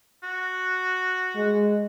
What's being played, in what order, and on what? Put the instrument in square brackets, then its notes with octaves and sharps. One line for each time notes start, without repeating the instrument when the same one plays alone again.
[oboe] F#4
[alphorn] G#3